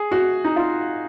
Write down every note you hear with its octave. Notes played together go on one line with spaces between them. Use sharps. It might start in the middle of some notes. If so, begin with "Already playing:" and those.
Already playing: G#4
F#4
D#4
F4